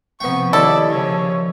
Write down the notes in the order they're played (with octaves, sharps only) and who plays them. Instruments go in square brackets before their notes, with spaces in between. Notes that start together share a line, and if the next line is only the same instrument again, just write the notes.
[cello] C3 F3 [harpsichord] B3 G5 [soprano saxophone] C#6
[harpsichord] D#2 D#5 [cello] E4 [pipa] A4 [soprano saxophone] D5
[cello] C#3 F3 [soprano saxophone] C#5